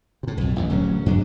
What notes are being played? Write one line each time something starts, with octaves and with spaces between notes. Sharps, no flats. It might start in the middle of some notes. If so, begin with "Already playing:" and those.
A2 C3
B1 F2
A1 E3
D1 F#3 C#4
G2 F#3 D4